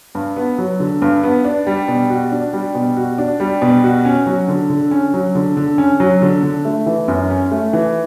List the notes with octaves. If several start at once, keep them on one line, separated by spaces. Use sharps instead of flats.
G2
B3
F#3
D3
G2
B3
D4
G3
B2
F#4
D4
G3
B2
F#4
D4
G3
B2
F#4
C#4
F#3
D3
D3
C#4
F#3
D3
D3
C#4
F#3
D3
D3
A3
E3
F#2
C#4
A3
E3